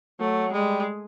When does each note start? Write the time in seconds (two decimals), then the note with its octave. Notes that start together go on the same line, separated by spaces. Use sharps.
0.20 F#3 A3
0.52 G3 G#3